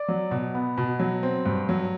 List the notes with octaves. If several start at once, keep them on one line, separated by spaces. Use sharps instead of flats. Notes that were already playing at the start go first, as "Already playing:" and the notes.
Already playing: D5
F#3
B2
B3
B2
F#3
C4
G2
F#3